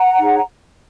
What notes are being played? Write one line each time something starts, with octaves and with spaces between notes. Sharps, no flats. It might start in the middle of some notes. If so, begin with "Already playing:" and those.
Already playing: F#5 A#5
D#4 G#4 C#5